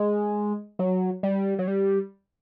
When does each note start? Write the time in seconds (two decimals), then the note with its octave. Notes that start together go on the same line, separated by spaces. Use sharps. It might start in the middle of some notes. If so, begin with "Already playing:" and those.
Already playing: G#3
0.79 F#3
1.23 G3
1.59 F#3
1.68 G3